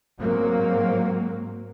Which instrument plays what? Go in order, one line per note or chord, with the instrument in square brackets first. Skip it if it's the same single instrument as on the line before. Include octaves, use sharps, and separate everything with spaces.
[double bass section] G#2 F#3 A#3 C4